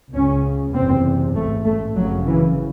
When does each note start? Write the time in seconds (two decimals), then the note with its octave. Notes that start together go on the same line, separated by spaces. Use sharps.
0.13 C#2 C#3 C#4
0.74 F#1 E2 C3 C4
1.35 A1 G#2 A3
1.65 A3
1.96 G#1 F#2 C#3 F#3
2.27 E3